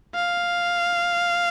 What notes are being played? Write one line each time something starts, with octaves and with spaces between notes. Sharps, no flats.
F5